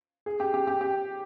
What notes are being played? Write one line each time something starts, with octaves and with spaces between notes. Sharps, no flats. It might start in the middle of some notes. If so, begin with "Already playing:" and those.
G#4
G4
G4
G4
G4